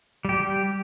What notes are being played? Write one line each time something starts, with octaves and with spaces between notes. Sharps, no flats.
G3 G4